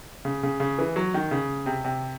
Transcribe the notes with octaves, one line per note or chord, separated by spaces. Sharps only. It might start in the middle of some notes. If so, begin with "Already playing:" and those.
C#3
C#3
C#3
E3
F#3
D#3
C#3
C3
C3